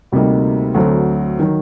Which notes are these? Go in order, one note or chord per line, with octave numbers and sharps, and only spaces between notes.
D2 C3 G3 A#3 D#4
D2 D3 F#3 C4
D#3 F#3